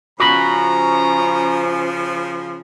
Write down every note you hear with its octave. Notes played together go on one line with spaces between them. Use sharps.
C#3 F3 C#4 F#4 A#5 B5